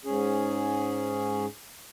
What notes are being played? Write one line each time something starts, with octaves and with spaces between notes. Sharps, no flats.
G#2 C#4 G#4